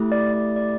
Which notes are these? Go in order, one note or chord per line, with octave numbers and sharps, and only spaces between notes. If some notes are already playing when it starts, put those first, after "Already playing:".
Already playing: A3 E4 G4
D5
D5
D5